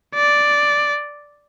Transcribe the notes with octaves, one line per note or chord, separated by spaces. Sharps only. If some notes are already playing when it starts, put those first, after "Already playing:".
D5